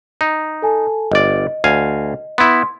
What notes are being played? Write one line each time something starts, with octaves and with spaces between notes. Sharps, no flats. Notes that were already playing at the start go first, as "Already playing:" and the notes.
D#4
A4 G#5 A5
G1 D5 D#5
D2 F5 G#5
B3 E4 C6